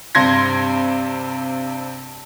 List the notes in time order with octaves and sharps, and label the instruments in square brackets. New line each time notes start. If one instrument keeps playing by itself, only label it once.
[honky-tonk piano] G2 C3 C6 G#6 A#6